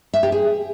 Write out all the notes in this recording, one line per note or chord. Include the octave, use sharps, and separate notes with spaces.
E5
G4
G#4